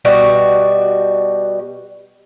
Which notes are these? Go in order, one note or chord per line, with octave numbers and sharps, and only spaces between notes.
B2 G3 F#4